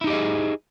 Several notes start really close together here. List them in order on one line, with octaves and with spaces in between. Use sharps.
E4 D#4 G4 D#5 G#4